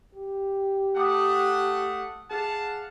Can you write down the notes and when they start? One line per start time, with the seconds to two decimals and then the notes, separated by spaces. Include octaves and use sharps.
0.14 G4
0.97 A3 F#5 D6 D#6
2.31 G#4 F5 F#5 A5